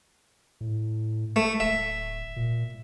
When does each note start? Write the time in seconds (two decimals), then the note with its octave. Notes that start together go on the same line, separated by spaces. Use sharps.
0.61 A2
1.36 A3
1.60 D1 E5
2.36 A#2